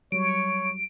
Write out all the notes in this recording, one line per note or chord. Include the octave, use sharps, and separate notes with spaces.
F#3 G3 C#5 D7